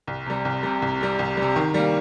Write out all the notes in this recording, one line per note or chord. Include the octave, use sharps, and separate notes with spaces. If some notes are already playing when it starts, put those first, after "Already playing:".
C2
C3 G3
C2
C3 G3
C2
C3 G3
C2
C3 G3
D#3
G3 A#3